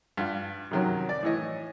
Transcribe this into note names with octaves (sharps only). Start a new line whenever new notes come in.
G2 F4
F#2 C3 D#3 F#3 C#4
D5
A2 E3 C#5 D#5